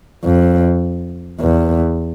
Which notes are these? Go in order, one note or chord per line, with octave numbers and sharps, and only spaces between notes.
F2
E2